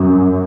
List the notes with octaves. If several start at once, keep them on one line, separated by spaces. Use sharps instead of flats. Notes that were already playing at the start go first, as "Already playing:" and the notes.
Already playing: F#2